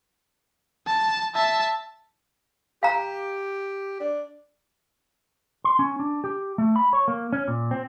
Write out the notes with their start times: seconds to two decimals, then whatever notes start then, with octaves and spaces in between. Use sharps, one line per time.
0.87 A5
1.35 E5 A5
2.83 G4 F5 A#5
4.00 D4
5.64 C6
5.79 C#4
6.00 D4
6.24 G4
6.58 A3
6.76 B5
6.93 C#5
7.08 A#3
7.33 C#4
7.48 A#2
7.71 C4